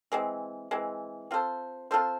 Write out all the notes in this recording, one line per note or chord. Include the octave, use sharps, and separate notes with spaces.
E3 G#3 C4
E3 G#3 C4
C4 F4 A4 C5
C4 F4 A4 C5